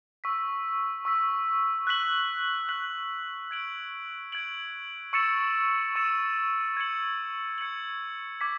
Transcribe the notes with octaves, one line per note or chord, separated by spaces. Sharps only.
C#6 E6 B6
C#6 E6 B6
F#6 B6 F#7
F#6 B6 F#7
G#6 D7 F#7
G#6 D7 F#7
C#6 E6 A6 C#7 E7
C#6 E6 A6 C#7 E7
G#6 C#7 F#7
G#6 C#7 F#7
D6 G#6 B6